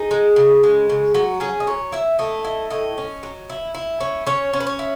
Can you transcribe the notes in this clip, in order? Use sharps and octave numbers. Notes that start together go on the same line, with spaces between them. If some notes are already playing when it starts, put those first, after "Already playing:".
Already playing: D#4 G#4
G#3
C#3
G#3
C#3
F#3 F#4
C#4 G#4
D#5
F#3 C#5
E4 E5
A3 D#5
E4 D#5
A2 D#5
C#4
F#3
E4
E4
C#4
C#4 C#5
C#4
B4
C#5
E4